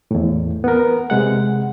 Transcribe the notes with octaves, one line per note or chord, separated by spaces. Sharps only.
E2 A2
B3 A#4
C3 G#3 F#5